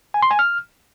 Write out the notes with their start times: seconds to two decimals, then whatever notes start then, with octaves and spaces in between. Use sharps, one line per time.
0.14 G#5
0.22 C6
0.31 G#5
0.39 F6